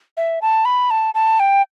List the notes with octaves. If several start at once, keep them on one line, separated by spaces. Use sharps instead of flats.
E5
A5
B5
A5
A5
G5